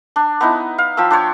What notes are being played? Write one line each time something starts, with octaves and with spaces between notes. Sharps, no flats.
D4
B3 D#4 E4
F5
F3 G5 B5 E6
D4 C5 C#5 G5